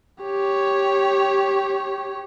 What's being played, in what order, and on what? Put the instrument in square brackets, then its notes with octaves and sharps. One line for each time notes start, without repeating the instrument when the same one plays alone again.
[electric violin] G4 C#5